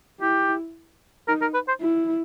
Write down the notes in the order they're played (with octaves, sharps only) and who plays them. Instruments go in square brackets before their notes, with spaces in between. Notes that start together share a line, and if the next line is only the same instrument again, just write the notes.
[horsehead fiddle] E4 [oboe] G4
[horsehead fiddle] D#4 [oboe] A#4
[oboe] A#4
B4
C5
[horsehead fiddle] E4